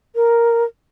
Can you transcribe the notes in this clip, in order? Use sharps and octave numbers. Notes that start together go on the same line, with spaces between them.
A#4